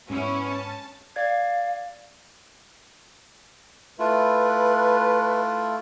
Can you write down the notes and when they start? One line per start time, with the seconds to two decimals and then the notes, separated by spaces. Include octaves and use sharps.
0.10 G#2 B3 C#4 E4
0.49 A5
1.16 D5 F5 G#6
3.99 A3 E4 F4 B4